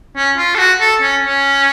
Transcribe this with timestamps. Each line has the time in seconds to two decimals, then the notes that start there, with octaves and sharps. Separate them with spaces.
0.16 C#4
0.37 F4
0.55 A4
0.59 F#4
0.80 A4
1.02 C#4
1.23 C#4